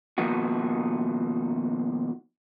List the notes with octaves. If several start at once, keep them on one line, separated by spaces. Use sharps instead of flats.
B2 D#3 F3 A#3 D#4 F#4